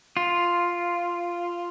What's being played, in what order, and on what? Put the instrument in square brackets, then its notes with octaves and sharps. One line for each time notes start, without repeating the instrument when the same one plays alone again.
[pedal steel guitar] F4